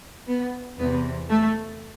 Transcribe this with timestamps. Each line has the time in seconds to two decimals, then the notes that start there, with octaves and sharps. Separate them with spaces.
0.28 B3
0.78 E2 C3 E3 B3
1.30 A3